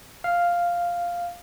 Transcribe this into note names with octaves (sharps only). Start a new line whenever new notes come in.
F5